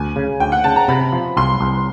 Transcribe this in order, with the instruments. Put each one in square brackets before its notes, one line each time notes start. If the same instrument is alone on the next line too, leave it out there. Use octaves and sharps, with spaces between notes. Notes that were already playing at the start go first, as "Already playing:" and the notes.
Already playing: [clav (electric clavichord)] D2 [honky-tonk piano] G#5
[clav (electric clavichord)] C#3
[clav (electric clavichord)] D2 [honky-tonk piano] G5
[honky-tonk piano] F#5
[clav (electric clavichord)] C#3 [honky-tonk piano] A5
[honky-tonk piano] A#5
[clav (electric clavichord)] C3 [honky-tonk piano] B5
[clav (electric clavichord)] F3
[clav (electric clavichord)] C2 [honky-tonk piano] C6
[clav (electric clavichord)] C2